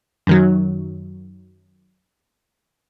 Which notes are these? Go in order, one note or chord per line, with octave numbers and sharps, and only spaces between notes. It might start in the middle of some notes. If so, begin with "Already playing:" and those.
F#2 D#3 F#3